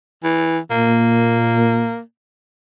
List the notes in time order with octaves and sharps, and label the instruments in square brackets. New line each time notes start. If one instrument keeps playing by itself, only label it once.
[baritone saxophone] E3
[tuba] A#2 [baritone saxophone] A#3